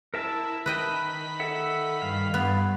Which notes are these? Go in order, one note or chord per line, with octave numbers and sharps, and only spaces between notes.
E4 A#4 E5 A5
D#3 B4 D#5 G5 B5
A4 E5 F#5
G2 F5
G2 B3